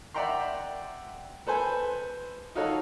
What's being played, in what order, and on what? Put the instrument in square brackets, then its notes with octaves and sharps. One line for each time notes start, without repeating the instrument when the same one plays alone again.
[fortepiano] D5 E5 F#5 G5 A#5 C6
A4 B4 C5 G#5
D#4 F4 F#4 A4 C#5